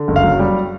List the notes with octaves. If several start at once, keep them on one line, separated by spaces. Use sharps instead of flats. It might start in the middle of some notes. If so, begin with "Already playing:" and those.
Already playing: D3
F#1
F5
F#3
G3